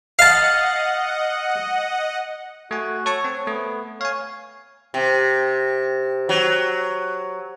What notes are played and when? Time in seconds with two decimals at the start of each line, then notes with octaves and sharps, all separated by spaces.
0.19 D#5 F5 F#5 A5
2.71 A3 F#4 G#5
3.06 A4 C#5 A5 C#6
3.25 C4
3.47 A3 B3
4.01 C#5 F5 G#5
4.94 C3
6.29 F#3